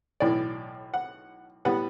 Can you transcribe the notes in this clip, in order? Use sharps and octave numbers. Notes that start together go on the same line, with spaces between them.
B1 A2 E3 D5
F#5
A2 G3 B3 F#5